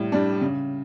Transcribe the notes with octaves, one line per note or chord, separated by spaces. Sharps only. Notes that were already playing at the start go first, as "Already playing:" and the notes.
Already playing: A2 G3
G3 D4
C#3